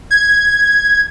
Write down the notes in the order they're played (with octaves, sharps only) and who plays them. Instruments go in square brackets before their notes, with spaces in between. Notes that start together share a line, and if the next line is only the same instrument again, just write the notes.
[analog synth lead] G#6